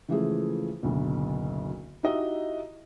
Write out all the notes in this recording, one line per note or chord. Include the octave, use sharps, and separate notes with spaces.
C#3 E3 F3 G#3 A3 G#4
F#1 D2 B2
D#4 E4 F#4 G4 D#5 E5